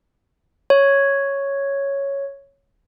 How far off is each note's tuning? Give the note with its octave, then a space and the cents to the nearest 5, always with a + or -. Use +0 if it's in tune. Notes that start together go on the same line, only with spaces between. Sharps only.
C#5 +0